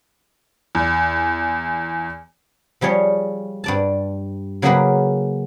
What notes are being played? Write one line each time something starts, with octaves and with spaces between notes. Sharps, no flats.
E2
F3 G3 G#4 C#5 D#5
G2 D5 A5
C#3 F#3 A#3 G4 G#4 B4